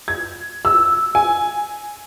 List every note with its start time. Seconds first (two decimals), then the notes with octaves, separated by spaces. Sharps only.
0.08 G#6
0.65 E6
1.15 G#5